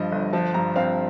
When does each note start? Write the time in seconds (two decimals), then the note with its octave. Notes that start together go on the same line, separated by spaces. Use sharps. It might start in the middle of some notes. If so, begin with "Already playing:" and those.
Already playing: G2 F3 D#5
0.12 G1
0.33 F3 A5
0.54 G2 A#5
0.76 C4 F5